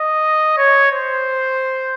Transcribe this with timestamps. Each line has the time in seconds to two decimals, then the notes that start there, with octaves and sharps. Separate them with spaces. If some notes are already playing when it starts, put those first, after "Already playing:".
Already playing: D#5
0.57 C#5
0.91 C5